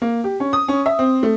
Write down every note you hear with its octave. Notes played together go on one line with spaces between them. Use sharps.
A#3
G4
C#4
D#6
C#4
E5
C4
A3